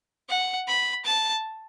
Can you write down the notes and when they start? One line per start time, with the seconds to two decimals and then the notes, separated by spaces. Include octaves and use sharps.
0.29 F#5
0.67 B5
1.05 A5